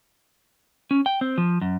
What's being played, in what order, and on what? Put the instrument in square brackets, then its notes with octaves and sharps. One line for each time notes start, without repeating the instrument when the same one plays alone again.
[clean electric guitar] C#4
G5
C4
F3
F#2